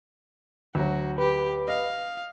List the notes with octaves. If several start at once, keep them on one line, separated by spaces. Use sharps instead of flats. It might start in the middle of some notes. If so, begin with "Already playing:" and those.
D2 F#3 F#4
G4 B4
D#5 F5